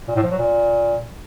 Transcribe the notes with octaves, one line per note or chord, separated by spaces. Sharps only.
A#2
A2
F3
F#3
A#2